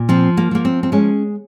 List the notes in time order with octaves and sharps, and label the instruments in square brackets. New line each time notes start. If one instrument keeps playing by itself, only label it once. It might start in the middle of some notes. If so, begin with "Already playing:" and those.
Already playing: [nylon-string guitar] A#2
F3 C4
A#3
F3 A#3
C4
C4
G#3 C#4